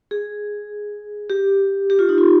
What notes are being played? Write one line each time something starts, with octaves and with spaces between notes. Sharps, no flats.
G#4
G4
G4
F4
D#4
F4